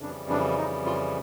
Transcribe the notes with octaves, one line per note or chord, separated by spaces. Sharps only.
F2 C#3 E3 G3 D4
D4
D#4
F4